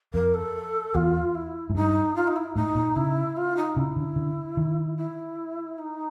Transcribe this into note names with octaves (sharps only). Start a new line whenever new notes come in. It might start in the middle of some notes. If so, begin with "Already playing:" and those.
F2 A#4
A4
E2 F4
E4
G#2
G2 D#4
F4
D#4
E4
A2 D#4
A#2
C#3 E4
F4
D#4
C#3 E4
D3
D3
D#3
E4
D#4